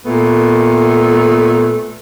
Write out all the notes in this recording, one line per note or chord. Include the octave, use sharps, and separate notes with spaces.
A#2 A3 B3